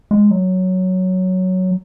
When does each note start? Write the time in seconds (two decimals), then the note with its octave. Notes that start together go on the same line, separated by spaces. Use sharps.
0.11 G#3
0.31 F#3